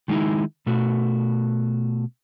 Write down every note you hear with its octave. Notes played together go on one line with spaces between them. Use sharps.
D#3 G#3 B3 D#4 E4
B2 A3 F#4